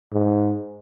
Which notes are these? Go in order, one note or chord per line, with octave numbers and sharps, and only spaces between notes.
G#2